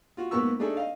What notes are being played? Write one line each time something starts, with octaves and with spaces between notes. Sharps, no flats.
F4 F#4
G#2 A#3 B3 A#4 C#6 E6
A3 D4 D#4 G#4 A4
D#5 F5